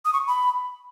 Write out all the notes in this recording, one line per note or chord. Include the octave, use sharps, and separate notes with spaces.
D#6
C#6
B5